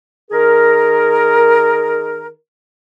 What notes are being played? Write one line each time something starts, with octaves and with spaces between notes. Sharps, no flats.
D#3 G#4 A#4